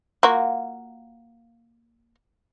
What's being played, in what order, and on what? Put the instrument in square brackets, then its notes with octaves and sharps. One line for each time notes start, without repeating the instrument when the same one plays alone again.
[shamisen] A#3 F4 F#4